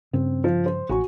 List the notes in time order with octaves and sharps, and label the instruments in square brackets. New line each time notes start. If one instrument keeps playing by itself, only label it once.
[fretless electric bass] G2 C#3 [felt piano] C4
[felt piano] F3
C5
[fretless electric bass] A1 [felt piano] F#4 G#5 C#6